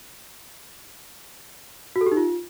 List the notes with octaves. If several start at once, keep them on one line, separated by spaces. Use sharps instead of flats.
F#4
A4
G4
D#4
F4